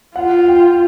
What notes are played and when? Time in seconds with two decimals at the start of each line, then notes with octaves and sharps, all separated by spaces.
0.16 F4 F#5
0.48 G5